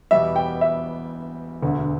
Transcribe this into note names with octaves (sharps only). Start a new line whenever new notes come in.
E2 B2 G3 B3 E5
G5
E5
E1 D2 D3